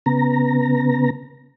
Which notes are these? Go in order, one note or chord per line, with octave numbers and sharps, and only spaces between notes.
C#3 B3 A#5